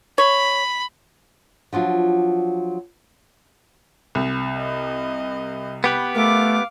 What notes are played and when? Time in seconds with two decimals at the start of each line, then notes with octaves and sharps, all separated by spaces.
0.18 C#5 B5
1.73 F3 F#3 D4 F4
4.15 C2
4.58 D#5
5.84 B3 G4 B4
6.15 A3 A#4 F5 D6